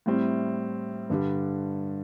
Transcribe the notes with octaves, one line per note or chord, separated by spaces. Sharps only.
A2 G3 C4 E4
G2 D3 G3